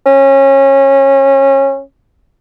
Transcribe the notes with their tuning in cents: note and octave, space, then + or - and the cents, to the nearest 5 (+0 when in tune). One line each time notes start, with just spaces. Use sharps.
C#4 -25